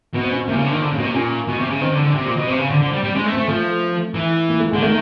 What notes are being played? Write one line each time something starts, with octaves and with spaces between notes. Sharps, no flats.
B2 B3
C4
C#4
C4
C3 A#3
C#3
D3
D#3
D3
C#3
B2
C3
A#2 C#4
B2
C3
C#3
D#3 C4
D3
D3
C3
A#2
B2
C3 C4
C#3
D3
D3
G3
G3
G#3 C#4
A3
C4
A3
F3 A3
E3
A#3
A3
D3 G#3
D#3 A3